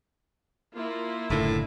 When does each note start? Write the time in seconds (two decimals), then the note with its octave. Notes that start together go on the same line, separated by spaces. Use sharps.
0.74 A#3 E4 F4
1.30 F#1 A2 D3